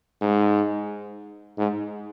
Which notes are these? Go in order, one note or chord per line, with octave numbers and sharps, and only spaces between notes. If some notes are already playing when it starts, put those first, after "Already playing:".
G#2
G#2